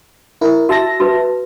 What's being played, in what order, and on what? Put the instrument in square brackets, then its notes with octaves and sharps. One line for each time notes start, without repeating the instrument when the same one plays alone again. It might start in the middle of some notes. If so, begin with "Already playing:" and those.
[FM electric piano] E4 A#4
[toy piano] F#4 [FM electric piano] E5 A5 A#6
[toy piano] F#4 B4